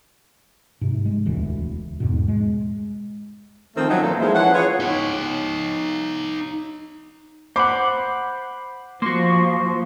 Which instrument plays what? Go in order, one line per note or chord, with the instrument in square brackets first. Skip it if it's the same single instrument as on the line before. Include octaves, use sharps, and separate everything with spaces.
[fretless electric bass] G#2 C3
G#3
E1 D2 E3
E2 G#2 B2
G#3
[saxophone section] D#3 F3 A3 C4
F3 F#3 C4 C#4 D#4
A#2 E3 A4
F3 G#3 E4 G#4 A#4 C5
E3 F3 C#4 F#5
F4 G#4 B4 C#5
[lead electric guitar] D#4 C#5
[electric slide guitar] C5 F#5 [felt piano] B5 D6
[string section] F3 [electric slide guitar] A#3 F#4 [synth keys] C6 C#6